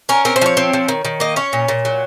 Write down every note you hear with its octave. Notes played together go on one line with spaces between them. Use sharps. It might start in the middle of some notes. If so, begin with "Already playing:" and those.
C#4 A#4
C4 A#4
C5
F3 C#5
C4
F3
D#3
D#3
A#3 D#5
C#4 C#5
A#2
A#2
F#3